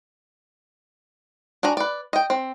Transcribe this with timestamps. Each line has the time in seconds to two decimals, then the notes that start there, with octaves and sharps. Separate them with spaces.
1.63 D4 F#4 G#5 A#5
1.77 B4 D5
2.13 D#5 G5
2.30 C4